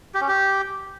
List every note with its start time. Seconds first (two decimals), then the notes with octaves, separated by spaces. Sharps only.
0.14 G4
0.21 C#4
0.28 G4